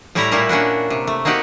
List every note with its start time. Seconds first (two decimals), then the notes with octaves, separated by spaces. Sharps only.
0.15 A2 G3 A3 E4 G4 A#5
0.31 A#2 G3 A3 A#3 E4
0.49 A#3 C#4 D4 F#4
0.90 C3
1.07 A3
1.25 A#3 C4 D#4 F#4 G4